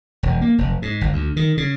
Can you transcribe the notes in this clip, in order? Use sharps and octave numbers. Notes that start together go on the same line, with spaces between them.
E1
A#3
F1
G#2
G1
D2
D#3
C#3